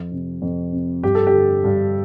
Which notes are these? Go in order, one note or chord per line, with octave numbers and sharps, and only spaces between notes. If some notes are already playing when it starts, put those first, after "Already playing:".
Already playing: F2
C3
F2
C3
G2 G4
A4
G4
D3
G2